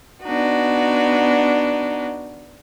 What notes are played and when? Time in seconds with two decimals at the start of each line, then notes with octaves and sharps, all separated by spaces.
0.23 B3 D4 D#4 F#4